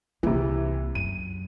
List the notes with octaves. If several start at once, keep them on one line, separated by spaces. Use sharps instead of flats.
C2 C3 E3 A#3
F#2 D#7